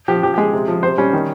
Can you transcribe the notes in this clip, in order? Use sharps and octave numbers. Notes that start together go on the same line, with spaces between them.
F3 G4
F3 G4
G4
G#3 G#4
C3
F3
C3 C5
G3 C#4
D#3